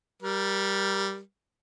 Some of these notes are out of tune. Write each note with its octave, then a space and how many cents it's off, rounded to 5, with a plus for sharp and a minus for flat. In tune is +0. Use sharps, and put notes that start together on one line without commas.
G3 +0 A#4 +20